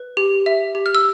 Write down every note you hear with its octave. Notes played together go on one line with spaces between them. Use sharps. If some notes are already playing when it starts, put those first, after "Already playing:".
Already playing: B4
G4
E5
G4
F6
E6